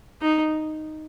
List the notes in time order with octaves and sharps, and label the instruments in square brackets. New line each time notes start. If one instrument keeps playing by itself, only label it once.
[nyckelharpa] D#4